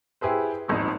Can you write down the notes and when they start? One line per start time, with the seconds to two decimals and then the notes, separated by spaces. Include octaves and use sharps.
0.21 E4 G4 G#4 B4 C5
0.68 D#1 G#1 F3 D#4